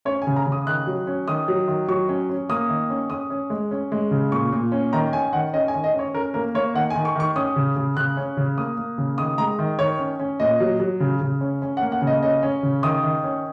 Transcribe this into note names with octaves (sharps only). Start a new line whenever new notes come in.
C#4 C#5
G#5
C#3
A#5
C#3
D#6
D#3 F#6
F#3
C#4
D#3 D#6
F#3
D#3
F#3 C#6
C#4
C#4
A#3 D#6
D#3
C#4
C#4 D#6
C#4
G#3
C#4
G#3
C#3
A#2 C#6
A#2
C#4
D#3 A#5
C#4 G#5
D#3 F#5
C#4 D#5
G#5
D#3
D#5
C#4
C#5
C#4 A#4
A#3 A#4
A#3 C#5
D#3 F#5
G#5
D#3
C#6
D#3 C#6
C#4 D#6
C#3
C#3
C#3 F#6
C#4
C#3
A#3 D#6
A#3
C#3
D#3 D#6
G#3 A#5
D#3
D#3 C#5
C#4
C#4
A#2 D#5
F#3
F#3
C#3
C#3
C#4
C#4
F#5
A#3
F#5
C#3
D#5
C#4 D#5
C#4
C#3
D#3 D#6
D#3
C#4